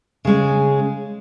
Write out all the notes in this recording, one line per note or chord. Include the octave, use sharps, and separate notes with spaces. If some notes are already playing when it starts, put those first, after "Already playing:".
C#3 G#3 C#4